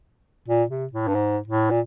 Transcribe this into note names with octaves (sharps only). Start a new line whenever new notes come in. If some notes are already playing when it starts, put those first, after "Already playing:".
A#2
C3
A2
G2
G#2
A2
A#2